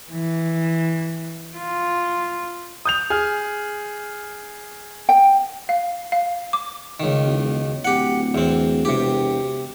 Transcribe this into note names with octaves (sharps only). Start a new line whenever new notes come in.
E3
F4
D#6 G6 F7
G#4 F6
G5
F5
F5
D6
C#2 D#3
E1
D1 G4 F#5
E2 C4
E1 C3 G4